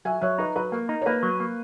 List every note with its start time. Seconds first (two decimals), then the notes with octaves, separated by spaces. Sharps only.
0.05 F#3 E5 G#5
0.22 F#3 C#5 E5
0.38 D#4 B4 D#5
0.56 F#3 B4
0.72 A#3 A#4
0.89 D#4
1.02 C#5
1.06 A#3 B4
1.23 F#3
1.40 A#3